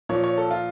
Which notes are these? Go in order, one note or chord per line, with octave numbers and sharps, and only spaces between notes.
A#2 F3 C#5
C#5
A4
F4